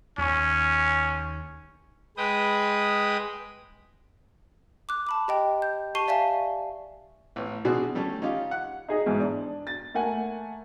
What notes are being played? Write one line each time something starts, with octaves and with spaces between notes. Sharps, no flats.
D#2 C#4
G#3 B4 G5 D#6
D6 F#6
A5 B5 D6
G4 D#5 G5
G6
G4 A5 C#6 C7 D#7 G7
D5 E5 F5 G#5 A5
A1 B3
B2 C4 D4 E4 F#4 G#4
G3 A3 C#4
C#4 D#4 F4 G4
F#5
D#4 G#4 D#5
G#2 B2 E3
D4
A6
A3 A#3 A#4 F#5 G#5